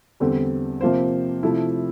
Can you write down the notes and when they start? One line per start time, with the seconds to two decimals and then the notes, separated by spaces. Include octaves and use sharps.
0.20 E2 D3 G3 C4
0.81 C3 F3 A#3 F4 C5
1.43 C3 F3 A3 E4